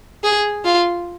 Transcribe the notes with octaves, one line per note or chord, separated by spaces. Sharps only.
G#4
F4